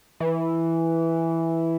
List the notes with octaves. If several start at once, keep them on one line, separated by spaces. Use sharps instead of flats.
E3